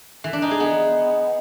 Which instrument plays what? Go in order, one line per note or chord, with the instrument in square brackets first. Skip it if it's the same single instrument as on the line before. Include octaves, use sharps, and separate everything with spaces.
[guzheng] E3
D4
D#4
G#4
B3